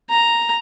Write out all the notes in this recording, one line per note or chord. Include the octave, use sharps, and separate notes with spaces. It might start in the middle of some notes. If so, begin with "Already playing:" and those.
A#5